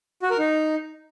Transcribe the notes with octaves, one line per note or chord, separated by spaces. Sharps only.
F#4
A#4
D#4